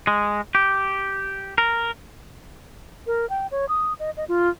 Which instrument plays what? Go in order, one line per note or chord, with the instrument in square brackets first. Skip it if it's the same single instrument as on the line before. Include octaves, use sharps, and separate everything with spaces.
[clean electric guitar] G#3
G4
A#4
[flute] A#4
G5
C#5
D#6
D#5
D#5
F4